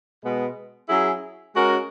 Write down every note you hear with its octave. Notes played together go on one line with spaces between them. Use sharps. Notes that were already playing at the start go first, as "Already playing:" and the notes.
B2 G#3 B3
F#3 C#4 E4 G#4
G#3 C#4 F#4 A#4